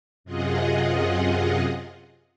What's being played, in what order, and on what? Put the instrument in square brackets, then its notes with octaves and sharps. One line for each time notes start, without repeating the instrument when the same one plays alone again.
[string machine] F#2 C3 F4 G#4 D#5 F#5